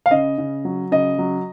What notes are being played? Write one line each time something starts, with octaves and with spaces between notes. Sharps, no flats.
F5
C#3 D#5
C#3
F#3
C#3 D#5
F#3